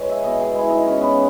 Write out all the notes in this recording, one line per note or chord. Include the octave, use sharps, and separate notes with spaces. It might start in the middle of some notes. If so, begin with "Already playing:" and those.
Already playing: G#3 B4 C#5 G#5
E5
B2 D#5
G#4
G#3 E4
D#4
C#3 C#4
B3